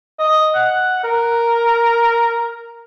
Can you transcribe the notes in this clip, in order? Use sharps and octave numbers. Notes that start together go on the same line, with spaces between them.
D#5
F#5
A#4